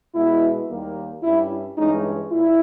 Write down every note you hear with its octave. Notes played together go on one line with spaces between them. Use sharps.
B2 G#3 B3 E4
D#2 D#3 G3 A#3
G2 G3 C#4 E4
G2 E3 G#3 C#4 D#4
A#2 E4